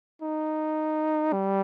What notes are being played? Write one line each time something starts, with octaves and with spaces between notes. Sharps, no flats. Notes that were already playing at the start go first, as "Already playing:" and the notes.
D#4
G3